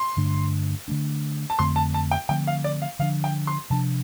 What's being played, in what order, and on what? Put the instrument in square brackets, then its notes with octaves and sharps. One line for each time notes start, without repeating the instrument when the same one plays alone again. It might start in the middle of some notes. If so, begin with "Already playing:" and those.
Already playing: [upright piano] C6
[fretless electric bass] G2 D3 A3 D4
D3 A3 D4
[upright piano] A5
[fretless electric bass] F2 D3 A3 C4 [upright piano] C6
[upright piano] A5
A5
G5
[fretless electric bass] D3 F3 A3 C4 [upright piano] G5
[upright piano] F5
D5
F5
[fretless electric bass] D3 F3 D4 [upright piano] F5
[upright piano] G5
C6
[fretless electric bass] C3 F3 D4 [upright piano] A5